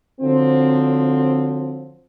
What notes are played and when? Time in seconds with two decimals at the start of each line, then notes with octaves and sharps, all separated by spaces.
0.21 D3 F3 F#3 C4